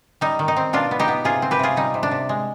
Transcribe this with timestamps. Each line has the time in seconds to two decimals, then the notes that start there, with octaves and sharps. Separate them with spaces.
0.21 G3 D#4
0.39 D#3
0.48 D#4
0.57 C4
0.73 B2 D4 F4
0.91 B3
0.99 D#4 G4
1.08 B3
1.24 C3 F4 G#4
1.42 C4
1.51 G4 B4
1.59 C3 F4 G#4
1.77 G3 D#4
1.94 C3
2.03 D4
2.11 C3
2.29 G#3